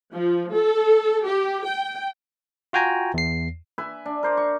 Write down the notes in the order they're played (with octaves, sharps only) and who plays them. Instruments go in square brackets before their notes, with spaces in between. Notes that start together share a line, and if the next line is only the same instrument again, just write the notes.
[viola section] F3
A4
G4
G5
[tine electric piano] F4 F#4 G5 G#5 A#5
E2 C7
[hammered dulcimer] B4 E5 G#5
D4
A#4 C5 D5
C#6